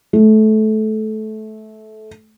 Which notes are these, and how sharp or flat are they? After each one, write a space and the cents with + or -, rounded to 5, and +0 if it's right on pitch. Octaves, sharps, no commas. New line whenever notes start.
A3 -20